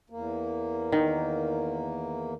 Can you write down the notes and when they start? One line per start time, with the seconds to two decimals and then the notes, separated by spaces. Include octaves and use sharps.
0.10 E2 A#3
0.92 D#3